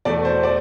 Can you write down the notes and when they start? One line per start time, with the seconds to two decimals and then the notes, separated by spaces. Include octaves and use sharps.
0.05 E2 B2 A3 D5
0.25 C5
0.43 D5